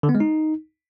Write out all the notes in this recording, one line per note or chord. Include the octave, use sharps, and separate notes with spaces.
D3
B3
G#3
D#4